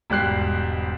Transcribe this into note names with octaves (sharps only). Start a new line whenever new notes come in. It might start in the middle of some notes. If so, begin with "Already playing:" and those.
E1 G#2 G3 F#6 C7